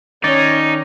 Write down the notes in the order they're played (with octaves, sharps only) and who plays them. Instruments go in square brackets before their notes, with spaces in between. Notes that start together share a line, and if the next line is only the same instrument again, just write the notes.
[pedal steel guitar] D#3 D5 [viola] C#4 [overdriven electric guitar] D#4 [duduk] C#5